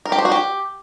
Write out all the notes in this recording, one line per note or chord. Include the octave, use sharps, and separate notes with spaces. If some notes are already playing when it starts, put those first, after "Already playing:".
A#4
G4
C5
F#4
G4